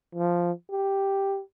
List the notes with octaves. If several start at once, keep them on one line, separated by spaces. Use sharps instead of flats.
F3
G4